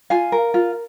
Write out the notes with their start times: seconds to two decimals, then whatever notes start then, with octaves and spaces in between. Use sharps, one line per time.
0.10 F4 F5 G#5
0.32 A#4
0.54 F4